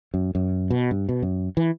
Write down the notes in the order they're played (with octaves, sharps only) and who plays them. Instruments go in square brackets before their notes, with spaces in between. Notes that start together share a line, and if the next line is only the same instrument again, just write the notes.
[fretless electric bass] F#2
F#2
B2
G2
B2
F#2
E3